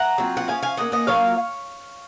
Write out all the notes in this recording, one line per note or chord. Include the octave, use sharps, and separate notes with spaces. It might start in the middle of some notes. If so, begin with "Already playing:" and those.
Already playing: F#5 A#5
F#3 C4 F4
F#5
F3 A#3 C#4 F5 G#5
F5 G#5
F3 A#3 C#4 D#5 F#5
D#5 F#5
F#3 A#3 F4 C#5 F5